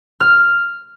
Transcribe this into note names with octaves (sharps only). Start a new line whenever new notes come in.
F6